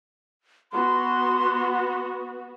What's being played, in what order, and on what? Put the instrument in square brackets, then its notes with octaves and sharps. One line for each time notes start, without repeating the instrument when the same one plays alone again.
[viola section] B3 F#4 [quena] C6